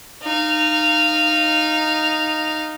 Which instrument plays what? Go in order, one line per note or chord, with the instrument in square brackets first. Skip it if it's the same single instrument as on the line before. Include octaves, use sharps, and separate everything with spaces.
[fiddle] D#4 F5